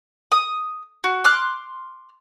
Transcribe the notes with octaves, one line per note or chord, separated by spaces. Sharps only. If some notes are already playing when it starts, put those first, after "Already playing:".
D#6
F#4
C6 D6 F6 F#6